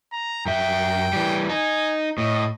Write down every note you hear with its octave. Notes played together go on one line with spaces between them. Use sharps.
A#5
F#2 E5 G5
E3 G3
D#4 G#5
A2 D#5